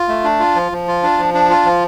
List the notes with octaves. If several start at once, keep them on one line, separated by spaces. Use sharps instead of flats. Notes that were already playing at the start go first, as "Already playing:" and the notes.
Already playing: F4
A3
D4
F4
F3
F3
F4
D4
F3
D4
F4
F3